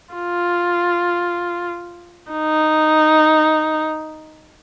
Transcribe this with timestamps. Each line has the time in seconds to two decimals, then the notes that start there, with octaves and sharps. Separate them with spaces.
0.14 F4
2.32 D#4